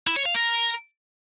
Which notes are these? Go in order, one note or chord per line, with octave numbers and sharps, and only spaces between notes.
E4
C#5
F5
A#4